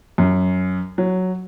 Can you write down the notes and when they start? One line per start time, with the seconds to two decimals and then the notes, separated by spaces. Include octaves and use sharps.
0.18 F#2
0.98 F#3